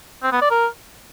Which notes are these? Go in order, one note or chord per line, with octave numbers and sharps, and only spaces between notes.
C4
B3
D5
A#4